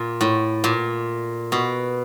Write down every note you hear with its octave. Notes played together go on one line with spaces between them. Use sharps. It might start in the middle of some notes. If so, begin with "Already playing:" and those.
Already playing: A#2
A2
A#2
B2